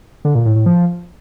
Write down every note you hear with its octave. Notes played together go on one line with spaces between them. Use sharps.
D3
A#2
A2
A2
F3